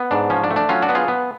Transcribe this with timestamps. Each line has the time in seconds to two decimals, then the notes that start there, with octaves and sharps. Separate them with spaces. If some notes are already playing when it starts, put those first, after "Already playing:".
Already playing: B3
0.11 G#2 D4
0.30 F3 C#4
0.44 D4
0.51 A3
0.56 D4
0.69 F#3 C#4 F4
0.82 D4 F#4
0.89 B3
0.95 F4 G#4
1.08 B3